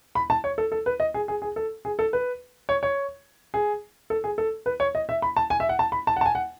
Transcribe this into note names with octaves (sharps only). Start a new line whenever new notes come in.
B5
A5
C#5
A4
A4
B4
D#5
G#4
G#4
G#4
A4
G#4
A4
B4
C#5
C#5
G#4
A4
G#4
A4
B4
C#5
D#5
E5
B5
A5
G#5
E5
F#5
A5
B5
A5
F#5
A5
G#5
F#5